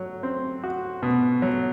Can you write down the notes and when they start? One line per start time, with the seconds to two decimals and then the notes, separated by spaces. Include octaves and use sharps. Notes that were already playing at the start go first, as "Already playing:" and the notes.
Already playing: F#3
0.23 C4
0.64 F#4
1.03 B2
1.42 F#3